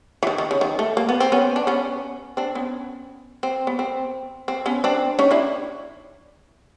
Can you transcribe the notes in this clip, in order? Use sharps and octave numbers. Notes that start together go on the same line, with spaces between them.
E3
D#3
D#3
C#3
D#3
A3
A#3
B3
C4
B3 C#4
D4
B3 C#4
C4 D4
B3 C#4
C4
B3
C4
C4
B3 C#4
C4 D4
C#4 D#4
D4 E4